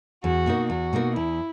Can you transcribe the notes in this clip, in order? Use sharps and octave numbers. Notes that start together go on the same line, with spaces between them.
E2 F#4
B2 A#3 D#4 A#4
E2 F#4
B2 A#3 D#4 A#4
E2 E4